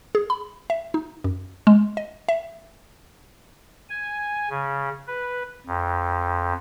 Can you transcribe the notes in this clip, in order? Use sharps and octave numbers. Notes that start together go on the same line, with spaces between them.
G#4
B5
E5
D#4
F#2
G#3
D#5
E5
G#5
C#3
B4
F2